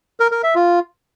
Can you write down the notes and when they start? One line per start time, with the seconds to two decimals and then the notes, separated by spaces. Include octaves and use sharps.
0.20 A#4
0.32 A#4
0.43 E5
0.55 F4